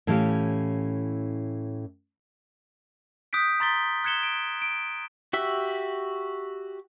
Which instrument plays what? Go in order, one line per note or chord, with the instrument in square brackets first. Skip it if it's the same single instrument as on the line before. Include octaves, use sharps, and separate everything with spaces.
[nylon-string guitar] A2 E3 C#4 G4 F5
[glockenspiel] D#6 F#6 G6 B6 D7
A#5 C6 A6 B6 G7
F#6 G#6 C#7 E7 G7
D7
D7
[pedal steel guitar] F#4 G4 E5